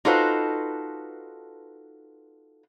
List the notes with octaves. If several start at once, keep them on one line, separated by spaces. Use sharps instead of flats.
D#4 F4 F#4 A4 B4 C5